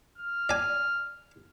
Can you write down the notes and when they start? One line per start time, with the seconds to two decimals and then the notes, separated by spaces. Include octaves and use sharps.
0.18 F6
0.49 D5 G#5